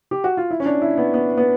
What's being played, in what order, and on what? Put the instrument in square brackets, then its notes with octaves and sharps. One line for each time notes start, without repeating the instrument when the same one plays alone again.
[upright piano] G4
F#4
F4
E4
C#4
D4
E4
B3
B3
B3